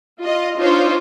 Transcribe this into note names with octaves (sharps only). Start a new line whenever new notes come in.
F4 D#5
D4 D#4 F4 C5 C#5